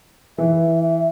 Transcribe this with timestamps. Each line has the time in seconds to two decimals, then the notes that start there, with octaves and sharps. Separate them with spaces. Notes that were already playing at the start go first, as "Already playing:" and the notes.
0.38 E3 E5